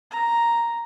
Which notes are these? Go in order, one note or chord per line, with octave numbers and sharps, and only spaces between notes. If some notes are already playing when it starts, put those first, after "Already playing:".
A#5